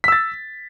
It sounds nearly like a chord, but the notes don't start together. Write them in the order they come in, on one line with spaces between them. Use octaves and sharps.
B6 E6 A6